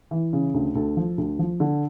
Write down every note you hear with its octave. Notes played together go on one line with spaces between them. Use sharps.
E3
C#3
D2
D2 A4
F3
D2
F3
D3